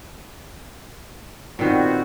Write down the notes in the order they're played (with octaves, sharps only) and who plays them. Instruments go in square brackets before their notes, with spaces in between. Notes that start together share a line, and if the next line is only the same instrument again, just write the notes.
[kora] A#2 D#3 [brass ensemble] B3 C4 F#4